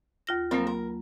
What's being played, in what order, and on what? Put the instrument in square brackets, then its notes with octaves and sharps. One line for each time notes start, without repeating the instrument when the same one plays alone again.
[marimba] D#2 F4 A#6
[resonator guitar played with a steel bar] F3 C4 A#4 [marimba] F#3 A#3
[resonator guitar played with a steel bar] A#4